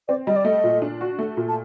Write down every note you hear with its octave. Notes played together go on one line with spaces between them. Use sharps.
C4 D5
G3 D#5
D5
A3 D#5
A#2
D4
F#4
A3
A#2
A5